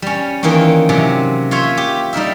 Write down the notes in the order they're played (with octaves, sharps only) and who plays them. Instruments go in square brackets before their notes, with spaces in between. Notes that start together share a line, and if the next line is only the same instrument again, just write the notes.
[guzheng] G3 C#4
D#3 E3 A#3 C4 C#4
C3 F#3 C4 C#4
F4 C5 C#5 E5
G4
G3 D#4 A#4 E5